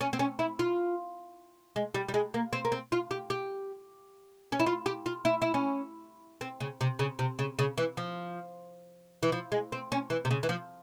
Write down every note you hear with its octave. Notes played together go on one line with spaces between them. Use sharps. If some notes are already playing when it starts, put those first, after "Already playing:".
C#4
C4
C#4
E4
F4
G#3
G3
G3
G#3
A#3
C4
A#3
C4
F4
G4
G4
C#4
E4
F4
G4
F4
E4
E4
C#4
C4
C#3
C3
C#3
C3
C#3
C#3
E3
F3
E3
F3
G#3
C4
C#4
E3
C3
C#3
E3
F3